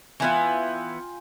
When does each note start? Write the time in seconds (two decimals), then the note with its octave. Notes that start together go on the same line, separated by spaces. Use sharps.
0.20 E3 B3 E4 F4 G5 G#5